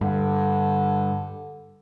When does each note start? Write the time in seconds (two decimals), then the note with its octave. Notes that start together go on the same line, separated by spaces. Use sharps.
0.01 G2 D3